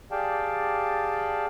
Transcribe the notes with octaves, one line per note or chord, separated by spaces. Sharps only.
G4 G#4 D5 F5 G5 A5